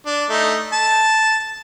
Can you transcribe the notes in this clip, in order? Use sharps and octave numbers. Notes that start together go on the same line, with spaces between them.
D4
A3 D#4
A5